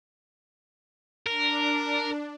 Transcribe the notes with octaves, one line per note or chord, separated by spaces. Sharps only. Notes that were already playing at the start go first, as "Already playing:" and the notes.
D4 A#4